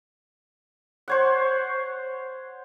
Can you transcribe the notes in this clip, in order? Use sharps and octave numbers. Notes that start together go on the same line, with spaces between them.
C5 C#5 F#5